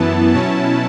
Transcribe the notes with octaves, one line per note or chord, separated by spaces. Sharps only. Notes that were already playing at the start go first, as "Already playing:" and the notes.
Already playing: F#2 E3 B3 E4 A5
B2 F#3 C#4 E4 A5